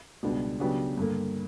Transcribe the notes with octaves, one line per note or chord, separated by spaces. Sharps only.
C#2 B2 G3 B3 D4
C#3 F#3 B3 D4 G4
G2 D3 A#3